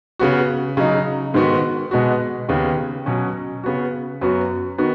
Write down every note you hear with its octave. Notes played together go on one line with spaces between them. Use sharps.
C#3 B3 F#4
C#3 F#3 D#4
G#2 D#3 B3 F#4
B2 G#3 B3 F#4
D#2 C#3 B3
B2 F#3 C#4
C#3 B3 F#4
F#2 F#3 B3 F#4
D#3 B3 F#4